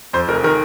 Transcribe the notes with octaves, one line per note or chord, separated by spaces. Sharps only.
F2 C5
F1 A#4
D#3 A#4